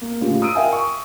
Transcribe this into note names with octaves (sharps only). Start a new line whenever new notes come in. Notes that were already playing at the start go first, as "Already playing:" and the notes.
A#3
A2 C#3 F4 G4
D#6 E6 D7 D#7
A#4 E5 F5 G5 G#5
C#6